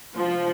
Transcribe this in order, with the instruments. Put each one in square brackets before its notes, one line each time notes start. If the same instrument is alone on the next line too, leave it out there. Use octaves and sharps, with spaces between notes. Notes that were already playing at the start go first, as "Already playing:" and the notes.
[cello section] C3 G#3 B3 D4 [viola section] F3